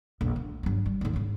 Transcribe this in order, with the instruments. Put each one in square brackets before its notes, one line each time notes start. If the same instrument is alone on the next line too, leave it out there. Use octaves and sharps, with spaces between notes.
[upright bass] A#1 F2
D2
G2 F#3
G3
D#2 G#2
G#2 C#3